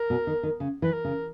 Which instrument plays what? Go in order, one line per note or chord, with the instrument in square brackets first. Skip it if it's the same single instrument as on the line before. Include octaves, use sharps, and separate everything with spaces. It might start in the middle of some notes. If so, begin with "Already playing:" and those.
Already playing: [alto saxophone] A#4
[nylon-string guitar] B2
D#3
D#3
C#3
[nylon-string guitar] E3 [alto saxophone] B4
[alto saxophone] A#4
[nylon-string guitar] C#3